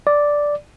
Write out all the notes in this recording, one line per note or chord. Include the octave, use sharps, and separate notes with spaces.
D5